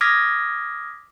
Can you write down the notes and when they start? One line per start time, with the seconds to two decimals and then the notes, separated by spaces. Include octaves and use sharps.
0.01 D6 D#6 F6 G#6 A#6 B6